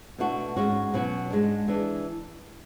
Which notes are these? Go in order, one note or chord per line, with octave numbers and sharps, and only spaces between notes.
B2 A3 D4 F#4
G#2 G#3 C#4 F#4
B2 F#3 C#4 F#4
G#2 G#3 D4
E3 G#3 D4